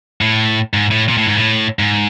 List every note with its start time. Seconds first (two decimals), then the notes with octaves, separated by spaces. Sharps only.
0.21 A2
0.74 G#2
0.91 A2
1.09 A#2
1.18 A2
1.27 G#2
1.36 A2
1.79 G#2